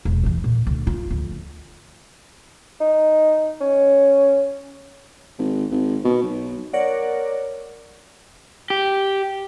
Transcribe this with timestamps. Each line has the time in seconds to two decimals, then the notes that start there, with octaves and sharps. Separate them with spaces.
0.05 E1
0.24 A2 E3
0.44 A#2
0.67 D2
0.87 F4
1.10 D2 F3
2.80 D#4
3.61 C#4
5.39 G#1
5.71 G#1
6.04 B2
6.23 B1
6.73 A#4 C#5 D5 F#5
8.70 G4